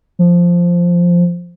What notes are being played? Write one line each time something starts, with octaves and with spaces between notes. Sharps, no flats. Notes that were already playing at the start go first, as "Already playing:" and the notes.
F3